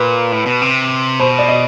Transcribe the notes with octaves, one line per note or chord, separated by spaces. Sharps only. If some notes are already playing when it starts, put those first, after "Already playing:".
Already playing: A#2 B4
A2
B2
C3
B2 C5
D5
D#5